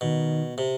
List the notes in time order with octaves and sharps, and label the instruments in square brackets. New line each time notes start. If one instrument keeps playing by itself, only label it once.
[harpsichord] B2 [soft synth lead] D#3
[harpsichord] C3